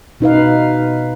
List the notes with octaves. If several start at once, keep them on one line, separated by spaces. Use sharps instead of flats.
B2 D#4 B4 F5